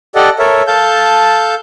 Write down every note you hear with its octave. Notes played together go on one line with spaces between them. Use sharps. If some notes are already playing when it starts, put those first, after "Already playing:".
G4 A4 D5 D#5 F#5
A4 A#4 C#5 E5
A4 F5 A5 G6